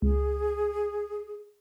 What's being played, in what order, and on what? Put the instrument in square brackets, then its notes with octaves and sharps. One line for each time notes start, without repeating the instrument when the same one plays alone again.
[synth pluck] C#2 [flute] G#4